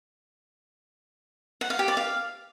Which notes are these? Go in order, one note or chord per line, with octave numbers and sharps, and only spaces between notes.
F#5
F5
G4
D5
F5